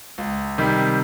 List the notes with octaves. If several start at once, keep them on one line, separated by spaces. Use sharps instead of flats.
C#2
C3 D#3 G3